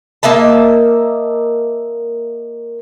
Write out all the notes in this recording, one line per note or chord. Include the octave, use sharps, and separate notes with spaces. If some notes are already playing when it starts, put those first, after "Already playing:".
A#3 D#5 E5 A5